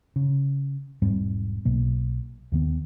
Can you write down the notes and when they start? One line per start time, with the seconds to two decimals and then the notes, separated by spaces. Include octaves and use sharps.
0.16 C#3
1.02 E1 G#2 G3 C4
1.65 B1 B2 A#3
2.52 D#2 D#3 B3